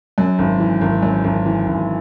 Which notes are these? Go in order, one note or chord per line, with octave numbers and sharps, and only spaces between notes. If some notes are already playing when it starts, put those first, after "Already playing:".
F#2
G#1
E3
G#1
F#2
G#1
E3
G#1